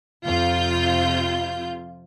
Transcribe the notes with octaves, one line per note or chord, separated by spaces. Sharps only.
F2 C3 F4 G6